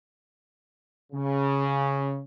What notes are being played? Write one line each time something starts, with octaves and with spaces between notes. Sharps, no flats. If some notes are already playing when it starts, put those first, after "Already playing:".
C#3